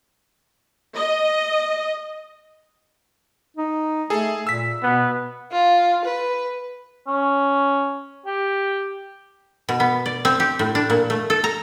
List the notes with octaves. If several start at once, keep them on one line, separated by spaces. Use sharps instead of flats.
D#5
D#4
A3 G#4 A4
A#2 E6 B6
B2 B3
F4
B4
C#4
G4
B2
B3
D5
C4
G4
A2
D4
A#2
A3
A4
A#5